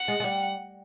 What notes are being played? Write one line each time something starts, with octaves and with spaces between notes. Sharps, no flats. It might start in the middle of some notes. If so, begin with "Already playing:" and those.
Already playing: F#5
G#3
G#3
G3